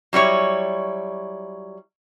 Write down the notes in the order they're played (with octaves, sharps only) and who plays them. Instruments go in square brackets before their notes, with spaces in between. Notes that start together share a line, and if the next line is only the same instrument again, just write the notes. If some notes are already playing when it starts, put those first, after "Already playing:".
[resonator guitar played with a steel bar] F#3 G3 E4 C#5